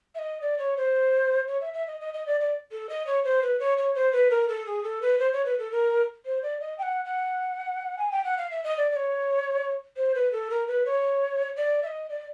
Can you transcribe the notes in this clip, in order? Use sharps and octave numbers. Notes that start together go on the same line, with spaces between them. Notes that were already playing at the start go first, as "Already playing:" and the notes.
E5
D#5
D5
C#5
C5
C#5
E5
E5
D#5
D#5
D#5
D5
D5
A4
D#5
C#5
C5
B4
C#5
C#5
C5
B4
A#4
A4
G#4
A4
B4
C5
C#5
B4
A4
A#4
C5
D5
D#5
G5
F#5
F#5
G#5
G5
F#5
F5
E5
D#5
D5
D5
C#5
C5
B4
A4
A#4
B4
C#5
D5
E5
D#5
D5